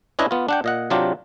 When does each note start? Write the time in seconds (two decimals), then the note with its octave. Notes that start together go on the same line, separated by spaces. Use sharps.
0.19 C#4 D4 E4 B4 D#5 G#5
0.31 B3 F4
0.48 D4 F#5 G5
0.64 A#2 D#5 F#5
0.90 C3 F#3 D4 F4 G4